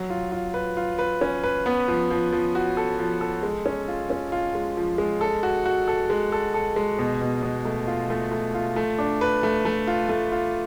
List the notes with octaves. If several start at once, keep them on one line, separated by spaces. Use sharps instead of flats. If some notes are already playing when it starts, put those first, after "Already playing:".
Already playing: F#3
F4
F4
B4
F4
B4
C#4
B4
B3
F3
F3
F3
F#4
A4
F3
A4
G#3
C#4
F4
C#4
F4
G#3
F3
G#3
A4
F#4
F#4
A4
G#3
A4
A4
G#3
B2
B2
B2
A3
F4
A3
A3
F4
A3
D4
B4
A3
A3
F4
A3
F4